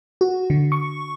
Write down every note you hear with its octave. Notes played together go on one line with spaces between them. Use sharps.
F#4
D3
C#6